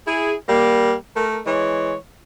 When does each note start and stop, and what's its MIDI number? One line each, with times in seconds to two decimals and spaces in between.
0.07 0.34 64
0.07 0.34 68
0.49 0.93 55
0.49 0.93 58
1.17 1.38 57
1.17 1.38 70
1.46 1.94 52
1.46 1.94 56
1.46 1.94 73